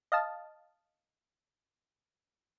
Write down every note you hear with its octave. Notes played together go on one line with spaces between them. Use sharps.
D#5 F5 A5